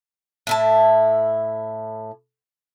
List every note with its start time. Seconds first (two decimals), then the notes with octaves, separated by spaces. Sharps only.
0.47 A2 E4 A5